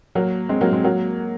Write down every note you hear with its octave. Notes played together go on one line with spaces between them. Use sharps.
F#3 A#3
G#3 C4
F#3 A#3
G#3 C4
F#3 A#3